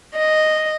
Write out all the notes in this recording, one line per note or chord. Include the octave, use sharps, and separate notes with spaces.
D#5